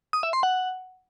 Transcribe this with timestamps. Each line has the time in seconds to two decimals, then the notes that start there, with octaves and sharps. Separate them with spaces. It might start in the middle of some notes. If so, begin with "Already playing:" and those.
0.13 D#6
0.23 E5
0.33 C6
0.43 F#5